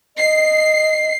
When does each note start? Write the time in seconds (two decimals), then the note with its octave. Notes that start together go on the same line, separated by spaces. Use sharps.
0.17 D#5 C7